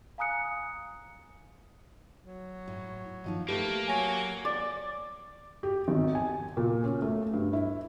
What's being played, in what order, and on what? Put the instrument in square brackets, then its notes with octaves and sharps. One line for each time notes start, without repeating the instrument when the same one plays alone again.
[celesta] F5 G#5 A#5 D#6 F#6 C#7
[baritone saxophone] F#3
[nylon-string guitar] A2
D#3 F3 D#4
[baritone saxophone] A3 [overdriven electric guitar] A#3 [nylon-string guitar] G4 B4
[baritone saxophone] F#3 [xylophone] G#5 A#6
[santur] D5
[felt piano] G4
G#1
G#5
A#2
C#4
A3
G2
E4